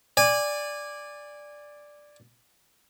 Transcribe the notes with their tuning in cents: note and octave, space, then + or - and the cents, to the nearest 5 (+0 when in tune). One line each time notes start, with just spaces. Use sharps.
D5 +0 G#5 -20